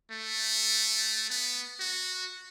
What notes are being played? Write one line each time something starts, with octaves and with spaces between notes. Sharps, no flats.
A3
B3
F#4